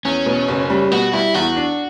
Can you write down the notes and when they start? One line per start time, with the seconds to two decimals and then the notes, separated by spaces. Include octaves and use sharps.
0.05 E2 C#4
0.26 B2
0.48 F#1
0.70 G3
0.92 B2 F#4
1.13 G3 E4
1.34 E2 F#4
1.56 D4